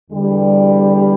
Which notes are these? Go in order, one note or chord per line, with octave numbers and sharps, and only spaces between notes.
E2 D3 G3